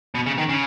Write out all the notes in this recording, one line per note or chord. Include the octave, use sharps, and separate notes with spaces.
B2
C#3
D#3
C#3